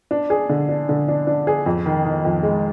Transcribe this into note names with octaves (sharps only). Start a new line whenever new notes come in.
D4
G#4
D3
D4
D3
D4
D4
G#4
F2
D#3
D#3
F2
G#3